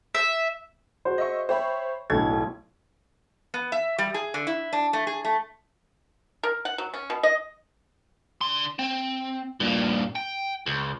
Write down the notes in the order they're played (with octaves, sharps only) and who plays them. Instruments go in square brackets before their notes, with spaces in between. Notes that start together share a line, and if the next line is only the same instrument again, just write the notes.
[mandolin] E5
[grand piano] F#4 G#4 C5
[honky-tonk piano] D#5 E5 C#6
[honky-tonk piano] C5 C#5 B5 [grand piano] E5 G5 C#6
[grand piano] B1 A2 [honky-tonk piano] D3 G#6
[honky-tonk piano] F1
[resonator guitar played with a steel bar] B3
E5
G3
G#4
D3
E4
D4
A3
G#4
A3
[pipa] A#4
F#5
F#3
C#4
B2
D#5
[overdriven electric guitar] D3 C6
C4
G2 A#2
G5
C#2